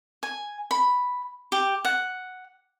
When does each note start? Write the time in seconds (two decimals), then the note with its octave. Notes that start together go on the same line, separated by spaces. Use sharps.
0.23 G#5
0.71 B5
1.52 G4
1.85 F#5